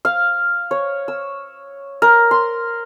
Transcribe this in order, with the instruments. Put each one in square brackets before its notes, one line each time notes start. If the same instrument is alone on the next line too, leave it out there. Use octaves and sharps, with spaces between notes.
[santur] F5
C#5
E6
A#4
C6